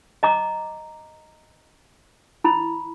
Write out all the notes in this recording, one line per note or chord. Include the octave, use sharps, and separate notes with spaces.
D#5 A#5 D6
E4 B5